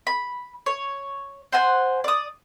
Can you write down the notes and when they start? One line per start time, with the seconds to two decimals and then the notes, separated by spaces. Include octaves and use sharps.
0.07 B5
0.66 C#5
1.52 C5 F#5 G#5
2.04 D5 D#6